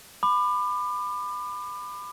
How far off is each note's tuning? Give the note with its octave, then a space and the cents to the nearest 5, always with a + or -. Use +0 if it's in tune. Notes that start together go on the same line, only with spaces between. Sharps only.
B5 +15 D6 +35